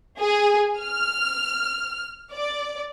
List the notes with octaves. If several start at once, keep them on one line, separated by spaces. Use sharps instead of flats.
G#4
F6
D5